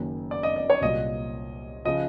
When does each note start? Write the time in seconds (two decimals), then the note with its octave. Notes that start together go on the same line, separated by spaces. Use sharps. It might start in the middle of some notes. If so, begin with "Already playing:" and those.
Already playing: F#1 F#2 D#3
0.31 D5
0.43 D#5
0.56 D5
0.70 C#5
0.81 C2 A#2 F#3 D#5
1.85 C#3 F3 D#5